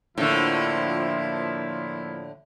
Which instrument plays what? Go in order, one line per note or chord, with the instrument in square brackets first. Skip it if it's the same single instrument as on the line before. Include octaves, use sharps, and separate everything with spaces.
[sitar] A2 D3 [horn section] F3 A#3 E4